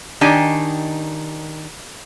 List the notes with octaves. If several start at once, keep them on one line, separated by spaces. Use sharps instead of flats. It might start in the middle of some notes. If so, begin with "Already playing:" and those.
D#3 D4 D#4 G4 G#5